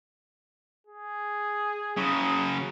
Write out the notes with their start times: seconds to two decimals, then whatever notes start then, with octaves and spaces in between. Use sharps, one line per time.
0.87 G#4
1.97 C#3 F#3 D#6